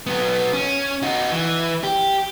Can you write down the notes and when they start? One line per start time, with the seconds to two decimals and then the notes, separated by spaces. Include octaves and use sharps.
0.07 F#3 B3
0.53 C#4
1.02 D#4 F#4
1.32 E3
1.84 G4